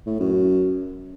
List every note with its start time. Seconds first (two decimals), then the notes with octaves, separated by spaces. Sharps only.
0.06 A2
0.20 F#2